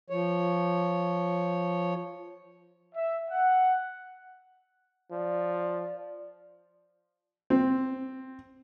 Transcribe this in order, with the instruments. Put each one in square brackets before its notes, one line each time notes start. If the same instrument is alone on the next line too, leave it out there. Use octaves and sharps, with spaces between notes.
[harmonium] F3 C#5
[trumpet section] E5
F#5
[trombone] F3 [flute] D5
[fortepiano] C4